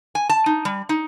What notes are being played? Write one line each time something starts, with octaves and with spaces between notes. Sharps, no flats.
G#5
A5
D#4
G3
D#4